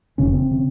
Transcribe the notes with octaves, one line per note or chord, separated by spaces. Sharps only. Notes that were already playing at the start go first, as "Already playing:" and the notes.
F1 F2 C#3 C#4
C4
C#3